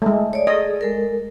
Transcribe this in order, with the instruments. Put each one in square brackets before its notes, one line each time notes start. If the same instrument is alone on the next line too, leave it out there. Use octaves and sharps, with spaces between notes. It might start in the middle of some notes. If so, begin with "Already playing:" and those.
[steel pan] G#3 A3
[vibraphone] C#5 D5
[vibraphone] G#4 A4 [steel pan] D#5
[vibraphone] G#3 A4 A#4